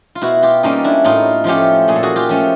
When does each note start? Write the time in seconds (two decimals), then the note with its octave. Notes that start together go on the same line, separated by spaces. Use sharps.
0.15 F4
0.21 B2 E4 F#4
0.43 F4 G4
0.63 G3 A#3 C#4 D#4 F4
0.84 D4 E4
1.04 A2 D#4 F4
1.44 F3 A3 C#4 F4 G4
1.88 A#2 G#4
1.96 A4
2.03 F#4 G#4
2.16 F4 G4
2.29 F3 A3 C#4